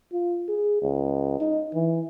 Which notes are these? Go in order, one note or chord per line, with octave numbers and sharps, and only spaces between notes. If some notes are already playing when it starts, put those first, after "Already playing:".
F4
G#4
C#2
D#4
E3